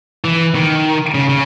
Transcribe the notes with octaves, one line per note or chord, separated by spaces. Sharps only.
E3
D#3
C#3
C#3